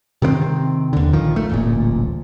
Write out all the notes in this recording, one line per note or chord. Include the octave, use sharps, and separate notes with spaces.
C3 D#3 A#3 C4
D#2 D3
A#1 D#3 F3
A3
D1 A1 A#2